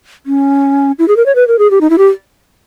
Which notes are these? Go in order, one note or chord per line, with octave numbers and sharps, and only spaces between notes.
C#4
E4
G#4
A#4
C#5
B4
A#4
G#4
G4
D#4
E4
G4